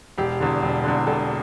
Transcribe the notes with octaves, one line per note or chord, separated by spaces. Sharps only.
E1 G4
E2 D3
E1
E2 D3
E1 A4